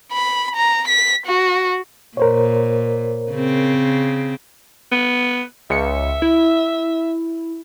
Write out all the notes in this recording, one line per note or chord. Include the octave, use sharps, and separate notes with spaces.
B5
A#5
B6
F#4
A#2 A#4 C5 C#5
C#3 C4
B3
C#2 E5 C#7
E4